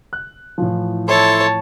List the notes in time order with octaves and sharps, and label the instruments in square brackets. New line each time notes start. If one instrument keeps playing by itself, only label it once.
[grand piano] F#6
A2 E3 F3
[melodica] E4 A4 C6 [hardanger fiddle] C#5 A5